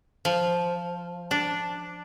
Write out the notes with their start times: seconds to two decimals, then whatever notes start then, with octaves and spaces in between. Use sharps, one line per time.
0.25 F3
1.31 D4